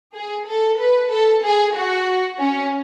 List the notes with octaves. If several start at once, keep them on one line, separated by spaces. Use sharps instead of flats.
G#4
A4
B4
A4
G#4
F#4
C#4